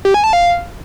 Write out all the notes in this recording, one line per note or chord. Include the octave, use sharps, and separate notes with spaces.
G4
G#5
A5
F5